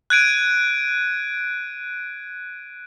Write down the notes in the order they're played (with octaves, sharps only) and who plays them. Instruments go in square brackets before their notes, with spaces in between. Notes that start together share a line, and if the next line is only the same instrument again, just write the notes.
[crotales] F#6 G#6 D7 D#7